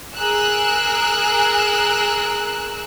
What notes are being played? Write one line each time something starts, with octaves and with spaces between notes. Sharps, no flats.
G#4 A#4 E6 F#6